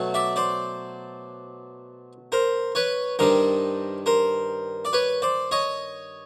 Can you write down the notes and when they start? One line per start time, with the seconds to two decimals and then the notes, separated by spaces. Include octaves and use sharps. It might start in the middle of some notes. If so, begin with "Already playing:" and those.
Already playing: B2 F#3 A3
0.14 D5 E5
0.36 C5 D5
2.32 A#4 C5
2.75 B4 C#5
3.19 G2 D#3 G3 A#4 C5
4.06 A#4 C5
4.85 D5
4.93 B4 C#5
5.22 C5 D5
5.51 C#5 D#5